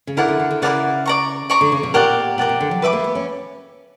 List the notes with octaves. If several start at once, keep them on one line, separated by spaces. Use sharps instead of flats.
C#3
D3 E4 A#4 D5 F#5
D3
D3
D3
C#3 E4 A#4 D5 F#5
D5 A#5 C#6
D5 A#5 C#6
D3
C#3
B2
A#2 G4 A#4 D5 F#5
B2 G4 A#4 D5 F#5
B2
D3
F#3
G3 B4 E5 B5 D6
A#3
B3
C#4